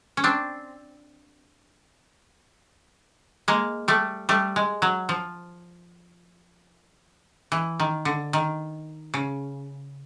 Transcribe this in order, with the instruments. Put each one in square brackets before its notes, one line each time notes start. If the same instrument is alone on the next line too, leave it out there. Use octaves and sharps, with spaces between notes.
[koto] C#4
C4 D4
G#3 A#3
G3 A3
G3 A3
G#3
F#3
F3
E3
D#3
D3
D#3
C#3